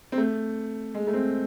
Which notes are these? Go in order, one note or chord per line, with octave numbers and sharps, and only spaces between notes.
C4
A3
G#3
A3
C4